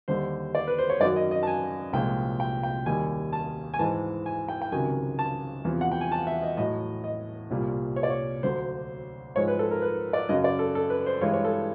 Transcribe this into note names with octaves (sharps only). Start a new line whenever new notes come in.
D#2 D3 G3 C5
D5
B4
C5
C#5
F#2 D#3 F#3 D5
D#5
D#5
A5
G#5
C2 A#2 F3 G#3 G5
G5
G5
D#2 D#3 G3 G#5
A5
G#5
G#2 E3 G#3 A5
G#5
G5
G5
C#2 C3 D#3 F#3 G#5
A5
E2 C3 F3
F#5
G5
G#5
A5
E5
D#5
A2 F#3 D#5
D#5
C2 A#2 G3
C#5
D5
C#5
D2 D3 F#3 C5
G#2 F3 G#3 C#5
B4
A4
A#4
B4
D5
F#2 C#3 F#3 D#5
D5
A4
A4
B4
C5
G2 E3 G#3 C#5
C#5
A4